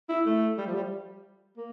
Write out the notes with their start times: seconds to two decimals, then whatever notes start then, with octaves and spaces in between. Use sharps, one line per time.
0.09 E4
0.26 A3
0.58 G3
0.67 F3
0.75 G3
1.57 A#3